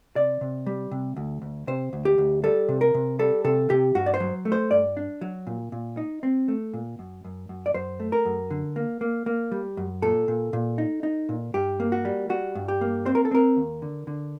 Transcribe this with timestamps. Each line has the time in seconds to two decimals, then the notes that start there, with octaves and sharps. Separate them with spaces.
0.16 C3 D5
0.41 C3
0.66 G3
0.91 C3
1.16 D2
1.42 D2
1.67 C3 C5
1.93 D2
2.05 G4
2.18 D2
2.44 G3 A4
2.69 C3
2.81 A#4
2.94 C3
3.19 G3 A4
3.44 C3 A4
3.70 C3 G4
3.95 G2 F#4
4.06 D5
4.14 C5
4.20 F#3
4.45 A3
4.52 C5
4.71 G2 D5
4.97 D4
5.21 F#3
5.47 A#2
5.72 A#2
5.97 D#4
6.23 C4
6.48 A3
6.73 A#2
6.99 F#2
7.25 F#2
7.49 F#2
7.66 D5
7.74 F#2 C5
8.00 A3
8.12 A#4
8.25 F#2
8.50 D3
8.76 A#3
9.01 A#3
9.26 A#3
9.52 G3
9.77 F#2
10.02 A#2 A4
10.28 A#2
10.53 A#2
10.78 D#4
11.03 D#4
11.29 A#2
11.54 G2 G4
11.80 A#3
11.92 F#4
12.05 G3
12.30 G3 F#4
12.55 G2
12.68 G4
12.81 A#3
13.05 C4 C5
13.15 A#4
13.25 A4
13.31 C4 A#4
13.57 D#2
13.82 D3
14.07 D3